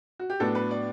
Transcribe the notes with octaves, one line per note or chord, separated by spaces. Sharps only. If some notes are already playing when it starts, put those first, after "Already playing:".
F#4
G4
A2 F#3 B3 D4 A4
B4
D5